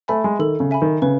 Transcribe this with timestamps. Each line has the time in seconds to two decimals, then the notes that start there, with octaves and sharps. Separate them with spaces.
0.08 A3 E5 G#5 B5
0.24 G#3
0.39 D#3 A4
0.60 C#3
0.71 E5 G#5 B5
0.82 D#3
1.02 C#3 B4